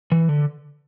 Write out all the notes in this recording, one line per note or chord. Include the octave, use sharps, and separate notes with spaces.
E3
D3